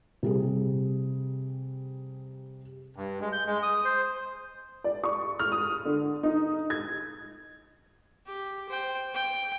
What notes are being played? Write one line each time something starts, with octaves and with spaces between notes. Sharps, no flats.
C3 G3 G#4
G2
G#3
G6
G#3
D#6
C5
D5
C#6
F6
D#6
D3
D#4
G#6
G4
C5 G5
G5